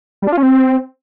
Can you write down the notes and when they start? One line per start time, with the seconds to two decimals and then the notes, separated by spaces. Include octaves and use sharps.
0.22 G3
0.27 D4
0.32 F4
0.37 C#4
0.43 C4